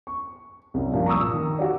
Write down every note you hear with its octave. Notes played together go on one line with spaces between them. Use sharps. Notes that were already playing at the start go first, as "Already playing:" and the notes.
C#6
C2 F#2
G2 A#2 F3
A#5 C#6 D#6 E6
D#3
F#4 G4 D5